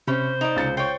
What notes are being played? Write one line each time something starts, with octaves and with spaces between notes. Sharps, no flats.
C3 C#4 C5 B5
D#4 D5
C#2 A6 C#7
C5 C#5 G5